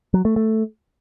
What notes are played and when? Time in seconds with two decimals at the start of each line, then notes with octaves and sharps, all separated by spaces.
0.14 F#3
0.25 A3
0.36 A3